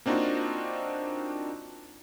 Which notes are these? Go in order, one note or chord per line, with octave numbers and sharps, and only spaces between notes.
A#3 C4 D4 D#4 F4 F#4